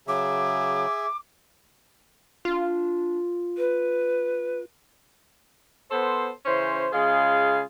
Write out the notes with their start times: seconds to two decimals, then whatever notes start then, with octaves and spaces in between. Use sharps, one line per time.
0.07 C#3 F#3 G#4 E5 D6
2.45 D4 F4
3.57 B4
5.91 B3 A4 C5
6.46 C#3 E3 C#4 C5
6.93 C#3 G#3 F4 G#4 F5